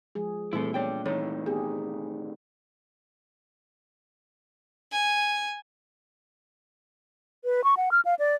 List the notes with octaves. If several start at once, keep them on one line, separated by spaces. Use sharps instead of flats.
F3 G#3 G#4
A#2 E3 G3 A3 C4 E4 A4
B3 D4 C#5 G5
C3 D#3 E3 A3 A4 C#5
B3 G4 G#4
G#5
B4
C#6
F#5
F6
F5
D5